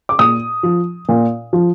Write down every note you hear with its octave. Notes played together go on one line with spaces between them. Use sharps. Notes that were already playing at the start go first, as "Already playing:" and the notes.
D6
A#2 D#6
F3
A#2
F3